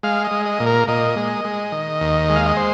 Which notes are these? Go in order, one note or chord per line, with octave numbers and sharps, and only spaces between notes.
G#3 F5
D#5
G#3
D#5
A#2
A#4
A#2 D#5
G#3
G#3
D#3
D#2
G#3
F5
D#5
C5